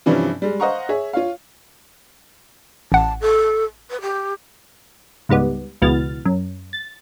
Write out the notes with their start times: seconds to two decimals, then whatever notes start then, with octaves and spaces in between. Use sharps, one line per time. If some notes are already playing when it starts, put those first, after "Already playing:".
0.06 G2 C3 E3 F3 G3 C#4
0.42 G3 G#3
0.60 C5 D#5 F5 F#5 A#5 C#6
0.89 G#4 C#5 E5
1.13 F4 C#5 F5
2.92 A1 F#5 A5
3.21 A4
3.90 B4
4.02 G4
5.29 C#2 G#2 G3 B3
5.82 C#2 B2 E3 F6 A6
6.25 F#2
6.73 A6